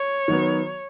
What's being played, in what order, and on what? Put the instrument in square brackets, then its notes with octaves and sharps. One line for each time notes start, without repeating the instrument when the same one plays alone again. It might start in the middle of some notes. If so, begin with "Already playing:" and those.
Already playing: [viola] C#5
[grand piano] D#3 F#3 B3